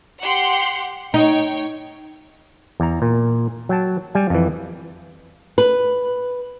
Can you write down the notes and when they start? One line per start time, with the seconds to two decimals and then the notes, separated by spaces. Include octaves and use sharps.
0.21 G4 F#5 C6
1.14 D#4 C#5 G5
2.80 E2 A#5
3.02 A#2
3.69 F#3 G5 A5
4.15 G3 G#5
4.30 F2 E3
5.58 B4